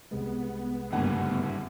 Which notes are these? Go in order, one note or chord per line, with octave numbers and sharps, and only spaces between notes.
C2 C3 G#3 B3
F#1 G2 A#2 D3 G3 A3 F#5